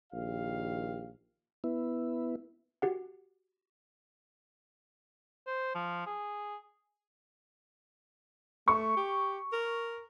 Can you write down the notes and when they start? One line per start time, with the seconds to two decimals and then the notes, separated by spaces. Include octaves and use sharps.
0.13 A#1 D#3 G4 F5
1.64 B3 E4
2.82 F#4 G4 F#5
5.47 C5
5.75 F3
6.06 G#4
8.68 A3 C#6
8.97 G4
9.53 A#4